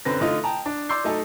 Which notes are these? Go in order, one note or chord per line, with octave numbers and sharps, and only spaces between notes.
F#2 D3 C4 B4 A#6
D3 A3 D#4 F4 D#5
G5 A5 A#5
D4
D5 C6 D6 E6 G6 C7
F#3 A3 D#4 A4